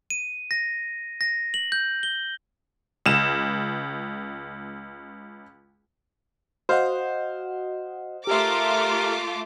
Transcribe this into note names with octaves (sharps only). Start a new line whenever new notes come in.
D#7
A#6
A#6
F#7
G6
G7
C#2 E7
F#4 C5 D#5 F5 F#5
A3 F4 G4 A#4 E5 D6